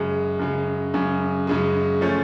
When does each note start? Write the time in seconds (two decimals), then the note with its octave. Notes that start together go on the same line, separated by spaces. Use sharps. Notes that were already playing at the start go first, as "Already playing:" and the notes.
Already playing: F#2 C#3 G#3
0.39 F#2 C#3 G#3
0.94 F#2 C#3 G#3
1.47 F#2 C#3 G#3
2.01 F3 A3 C#4